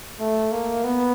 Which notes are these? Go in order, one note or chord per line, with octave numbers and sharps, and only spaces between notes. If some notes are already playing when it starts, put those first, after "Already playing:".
A3
A#3
B3